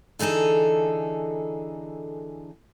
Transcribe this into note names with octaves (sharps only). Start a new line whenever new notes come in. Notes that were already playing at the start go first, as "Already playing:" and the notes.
D3 E3 D#4 G#4 A4